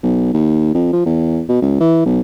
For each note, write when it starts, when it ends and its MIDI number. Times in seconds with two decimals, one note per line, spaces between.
0.03 0.32 35
0.33 0.74 39
0.74 0.90 41
0.93 1.03 53
1.06 1.42 40
1.48 1.58 47
1.62 1.78 37
1.80 2.01 52
2.05 2.21 35